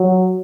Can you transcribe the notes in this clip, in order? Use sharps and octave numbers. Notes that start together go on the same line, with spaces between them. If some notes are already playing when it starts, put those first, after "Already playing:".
Already playing: F#3